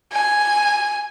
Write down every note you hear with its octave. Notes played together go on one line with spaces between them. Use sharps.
G#5